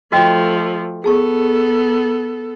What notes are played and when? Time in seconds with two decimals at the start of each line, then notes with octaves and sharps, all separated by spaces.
0.12 F3 A3 F#4 D#5 G5
1.04 B3 G#4 A4 A5 C#6